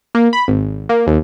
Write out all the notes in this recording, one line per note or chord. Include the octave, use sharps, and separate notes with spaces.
A#3
B5
G#1
A#3
D#2